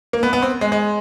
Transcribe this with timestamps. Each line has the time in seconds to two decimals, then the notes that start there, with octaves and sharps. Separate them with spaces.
0.13 A#3
0.23 B3
0.33 B3
0.42 C4
0.61 G#3
0.72 G#3